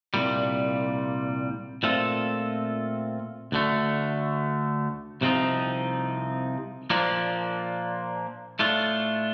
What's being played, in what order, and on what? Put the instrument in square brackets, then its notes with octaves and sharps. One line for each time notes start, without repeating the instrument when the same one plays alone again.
[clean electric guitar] C2 A#2 G3
A#2 A3 C4 F4 A4
D2 D3 A3
C2 C3 F3 C4 D#4
A#2 F3 A#3 D4
A2 A3 D4 F4